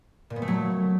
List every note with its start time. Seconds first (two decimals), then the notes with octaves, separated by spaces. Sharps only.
0.30 A#2
0.36 B3
0.42 A3
0.48 F#3